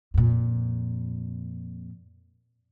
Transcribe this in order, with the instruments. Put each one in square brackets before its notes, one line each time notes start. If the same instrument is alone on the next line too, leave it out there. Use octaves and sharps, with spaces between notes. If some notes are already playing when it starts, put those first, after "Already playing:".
[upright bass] F2 A#2